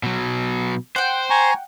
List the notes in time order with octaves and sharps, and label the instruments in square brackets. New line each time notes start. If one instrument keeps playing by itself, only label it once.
[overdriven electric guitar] B2 F#3
[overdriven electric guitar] C5 [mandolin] F#5 G5
[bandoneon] G#5 A#5 C#6